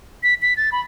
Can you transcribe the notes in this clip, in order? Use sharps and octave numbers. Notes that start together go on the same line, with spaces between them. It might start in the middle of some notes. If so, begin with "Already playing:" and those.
B6
B6
A6
B5